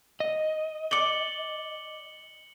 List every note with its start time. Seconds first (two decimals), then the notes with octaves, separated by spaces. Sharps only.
0.20 D#5
0.91 D5 D6 C#7 F#7 G7